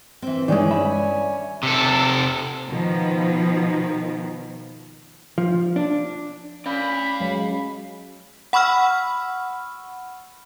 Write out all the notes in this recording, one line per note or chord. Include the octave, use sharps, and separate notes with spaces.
G2 E3 C4
G2 D#3 E3 G#3 C#4 C#5 D5 G#5
E5 B5
C3 A4
B2 D#3 F3
F3
D4
C#4 D5 F5 B5
F#3 G#3
F#5 B5 C#6 E6 F6